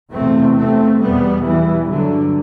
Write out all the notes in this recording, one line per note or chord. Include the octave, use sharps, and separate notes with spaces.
E2 C3 A3 C4
A3 C4
E2 B2 G3 B3
E3 G3
G2 D3 F#3